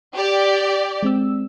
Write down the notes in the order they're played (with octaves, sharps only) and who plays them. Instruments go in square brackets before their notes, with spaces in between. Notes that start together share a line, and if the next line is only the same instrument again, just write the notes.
[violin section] G4 D5
[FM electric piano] G#3 C4 E6